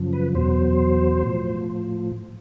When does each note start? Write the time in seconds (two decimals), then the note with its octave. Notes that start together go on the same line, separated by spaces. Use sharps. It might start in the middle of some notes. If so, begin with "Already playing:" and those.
Already playing: F#2 C#3 F3
0.13 B4
0.35 E2 B2 F#3 C5
1.23 A2 F3